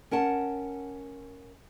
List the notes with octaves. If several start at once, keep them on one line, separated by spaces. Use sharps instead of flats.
C#4 A#4 F#5 A5